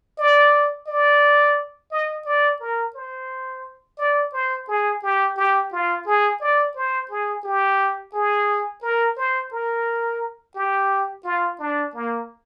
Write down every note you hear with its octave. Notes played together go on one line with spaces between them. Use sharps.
D5
D5
D#5
D5
A#4
C5
D5
C5
G#4
G4
G4
F4
G#4
D5
C5
G#4
G4
G#4
A#4
C5
A#4
G4
F4
D4
A#3